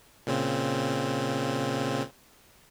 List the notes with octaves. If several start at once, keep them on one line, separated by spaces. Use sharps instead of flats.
A#2 C#3 C4